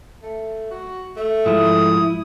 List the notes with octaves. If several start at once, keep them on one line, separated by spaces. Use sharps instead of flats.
A3
F#4
A3
G#2 F3 E4 D#6